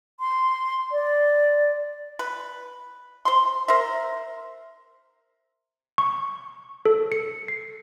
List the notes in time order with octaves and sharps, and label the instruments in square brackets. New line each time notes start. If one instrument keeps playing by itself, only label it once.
[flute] C6
D5
[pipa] B4
C5 C6
A#4 C5 E5
[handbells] C#6
A4
C#7
C7